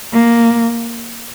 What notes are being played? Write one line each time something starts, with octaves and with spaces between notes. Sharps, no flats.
A#3